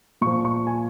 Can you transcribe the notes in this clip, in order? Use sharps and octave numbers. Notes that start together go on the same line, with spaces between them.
A#2 F3 C#6
C#6
G#5